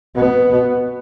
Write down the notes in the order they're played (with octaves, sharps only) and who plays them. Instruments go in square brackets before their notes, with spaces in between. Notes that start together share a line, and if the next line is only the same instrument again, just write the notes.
[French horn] B2 [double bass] B3
[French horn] B2